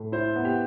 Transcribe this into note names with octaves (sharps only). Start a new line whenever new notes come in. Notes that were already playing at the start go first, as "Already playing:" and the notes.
Already playing: A2
E4 C5
B3
G4